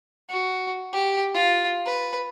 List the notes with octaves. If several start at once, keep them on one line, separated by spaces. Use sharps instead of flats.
F#4
G4
F4
B4